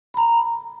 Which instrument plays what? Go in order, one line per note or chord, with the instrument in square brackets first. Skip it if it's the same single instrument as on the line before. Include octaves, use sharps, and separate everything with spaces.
[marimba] A#5 B5